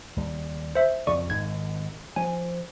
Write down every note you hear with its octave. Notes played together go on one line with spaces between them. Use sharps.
D#2 G3
C5 E5
F2 C#3 D5 C#6
G#1 G#2 D#3 G#6
F3 G#5